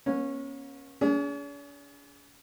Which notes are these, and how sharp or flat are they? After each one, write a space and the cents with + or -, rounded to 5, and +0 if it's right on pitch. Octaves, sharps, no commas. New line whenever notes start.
A#3 +45 C#4 -15
C#4 +45 G#4 +0